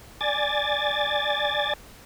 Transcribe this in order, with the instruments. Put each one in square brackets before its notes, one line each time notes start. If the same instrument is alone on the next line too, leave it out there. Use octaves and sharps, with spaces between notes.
[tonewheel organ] D5 G#5 A6